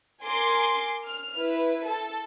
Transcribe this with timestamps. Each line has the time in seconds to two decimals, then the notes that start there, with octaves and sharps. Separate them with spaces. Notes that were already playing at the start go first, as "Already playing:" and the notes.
0.23 A#4 G#5 C6 D6 C7
1.06 F6
1.38 E4 B4
1.89 A4